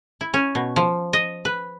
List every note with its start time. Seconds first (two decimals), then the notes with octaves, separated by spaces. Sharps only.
0.21 E4
0.34 C#4
0.55 B2
0.76 F3
1.13 D#5
1.45 B4